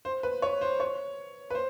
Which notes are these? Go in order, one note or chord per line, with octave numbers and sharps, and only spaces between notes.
C5
B4
C#5
C5
C#5
B4
C5